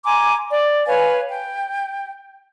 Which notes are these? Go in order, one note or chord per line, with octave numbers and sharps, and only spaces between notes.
G#5 A#5 C6 D6
D5
B4 C#5 F5 G#5
G5